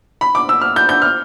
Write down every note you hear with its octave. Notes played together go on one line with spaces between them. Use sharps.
B5
D6
E6
F6
G6
G6
F6